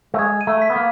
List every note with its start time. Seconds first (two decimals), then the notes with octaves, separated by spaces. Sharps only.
0.14 A3
0.19 G#3 G#6
0.41 D#7
0.47 A3
0.62 B6
0.70 B3
0.76 A#3